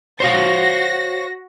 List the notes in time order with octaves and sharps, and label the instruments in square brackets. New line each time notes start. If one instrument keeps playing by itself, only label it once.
[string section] F#4 A#6 [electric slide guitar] C5 C#5 F5